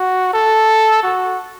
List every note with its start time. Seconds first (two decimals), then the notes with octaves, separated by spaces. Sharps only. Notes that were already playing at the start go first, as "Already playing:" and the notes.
Already playing: F#4
0.33 A4
1.03 F#4